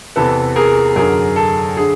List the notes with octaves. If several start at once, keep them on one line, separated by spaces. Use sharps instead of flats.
E2 C3 E3 A4 B4
G#4 A#4
F#2 D3 G#4 A#4
A4
D3 G#4